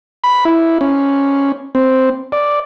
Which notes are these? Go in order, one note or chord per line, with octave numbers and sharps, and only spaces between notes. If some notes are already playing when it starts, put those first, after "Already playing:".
B5
E4
C#4
C4
D5